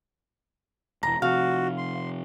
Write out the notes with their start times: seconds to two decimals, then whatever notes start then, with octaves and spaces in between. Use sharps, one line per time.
1.03 E1 E3 A#5
1.22 C3 F3 F#4 F5
1.78 C6